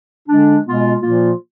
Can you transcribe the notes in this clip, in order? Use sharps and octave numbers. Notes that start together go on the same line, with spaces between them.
D3 G#3 D4
B2 G#3 B3 F4
A#2 F3 A#3 F4